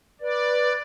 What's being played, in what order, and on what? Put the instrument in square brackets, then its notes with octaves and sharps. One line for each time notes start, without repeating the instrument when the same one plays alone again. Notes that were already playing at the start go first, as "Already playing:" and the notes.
[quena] B4 [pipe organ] D5